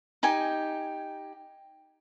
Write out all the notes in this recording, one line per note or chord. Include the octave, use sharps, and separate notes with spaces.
D#4 G4 G#5